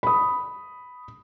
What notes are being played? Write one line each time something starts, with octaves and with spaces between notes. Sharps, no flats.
B5 D#6